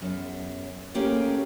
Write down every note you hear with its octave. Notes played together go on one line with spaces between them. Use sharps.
F#2 B3 G#4
A3 A#3 C#4 G4 G#4